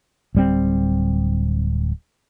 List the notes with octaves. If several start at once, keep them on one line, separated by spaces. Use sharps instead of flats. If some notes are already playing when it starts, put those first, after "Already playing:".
D1 G3 C4